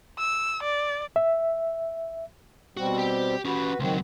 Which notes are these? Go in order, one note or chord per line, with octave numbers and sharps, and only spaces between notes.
E6
D5
E5
B2 G3 C4 F#4
G4 G5
C#4 F#4 G4 B4
C#2 D#3 F#3 C4